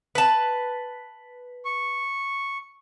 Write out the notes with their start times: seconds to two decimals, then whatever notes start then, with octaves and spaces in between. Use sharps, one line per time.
0.15 B4 A5
1.65 C#6